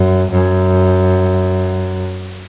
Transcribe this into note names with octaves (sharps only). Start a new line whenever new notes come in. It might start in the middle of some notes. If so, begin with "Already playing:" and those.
Already playing: F#2
F#2